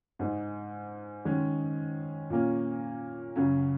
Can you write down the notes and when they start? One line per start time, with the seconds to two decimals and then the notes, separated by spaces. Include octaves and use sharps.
0.19 G#2 G#3 D#4
1.25 D#3 G#3 C#4
2.30 A#2 A#3 C#4
3.36 F#2 C#3 F#3 C#4